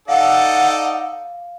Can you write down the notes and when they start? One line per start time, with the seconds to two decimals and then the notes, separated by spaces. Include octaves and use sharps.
0.08 D#4 A4 D5 F5 F#5